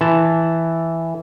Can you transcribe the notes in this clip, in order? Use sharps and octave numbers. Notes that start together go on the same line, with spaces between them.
E3 A5